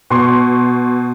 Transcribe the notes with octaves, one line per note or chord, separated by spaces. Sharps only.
B2 C6 C#6